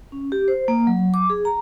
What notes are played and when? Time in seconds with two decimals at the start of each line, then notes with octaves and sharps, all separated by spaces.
0.12 C#4
0.32 G4
0.48 C5
0.68 A#3
0.87 F#3
1.14 D6
1.30 G#4
1.45 A#5